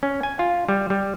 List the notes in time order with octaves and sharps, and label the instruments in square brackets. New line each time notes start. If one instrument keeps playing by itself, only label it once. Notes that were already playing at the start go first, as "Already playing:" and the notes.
[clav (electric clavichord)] C#4
G#5
F4
G3
G3